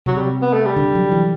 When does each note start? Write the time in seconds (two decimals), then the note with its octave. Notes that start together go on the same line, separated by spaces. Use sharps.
0.06 C3 F#3
0.18 G3
0.42 B3
0.53 A3
0.66 G3
0.76 D3
0.95 F#3
1.12 E3